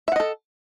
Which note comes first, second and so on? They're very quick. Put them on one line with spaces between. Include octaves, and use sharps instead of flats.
E5 F#5 D#5 A4